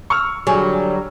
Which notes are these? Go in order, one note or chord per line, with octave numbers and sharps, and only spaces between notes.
C#6 E6 F6
D3 F#3 G3 G#4